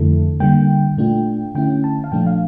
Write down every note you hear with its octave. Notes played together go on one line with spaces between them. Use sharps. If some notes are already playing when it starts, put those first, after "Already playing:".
Already playing: F2 D3 A3 E4 A4
D3 G3 A#3 G5
A#2 A3 D4 F4
D3 A3 C#4 E4 G5
A5
F5
A#2 F3 A3 D4 G5
F5